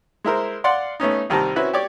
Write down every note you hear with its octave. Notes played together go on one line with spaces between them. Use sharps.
G#3 E4 A#4 C5
D5 F5 F#5 C6
A3 B3 C#4 D#4
C2 D#3 G3 C4 A5 A#5
C4 C#4 E4 F#4 B4
G4 C#5 D5 D6